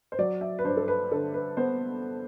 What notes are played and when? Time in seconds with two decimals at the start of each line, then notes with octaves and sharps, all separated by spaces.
0.12 C5
0.19 F#3 D5
0.41 E5
0.59 B4
0.64 G2 C5
0.77 A4
0.88 B4
1.11 D3 A4
1.34 B4
1.57 B3 C5